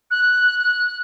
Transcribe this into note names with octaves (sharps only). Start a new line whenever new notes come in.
F#6